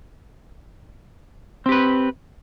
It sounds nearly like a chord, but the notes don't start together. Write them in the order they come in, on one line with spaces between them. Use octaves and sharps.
C4 G4 B4